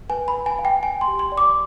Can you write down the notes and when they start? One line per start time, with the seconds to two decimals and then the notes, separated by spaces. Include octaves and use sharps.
0.10 B4 G#5
0.28 B5
0.34 B4
0.46 G#5
0.59 F5
0.65 G5
0.83 G5 G#5
1.01 C6
1.08 G4
1.19 C6
1.32 D5
1.38 D6